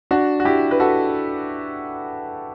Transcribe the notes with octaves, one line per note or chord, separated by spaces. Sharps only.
D4 F#4
F#4
E4 G4
B4
F#4 A4